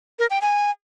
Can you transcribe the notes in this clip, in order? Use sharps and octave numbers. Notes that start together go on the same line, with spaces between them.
A#4
G5
G#5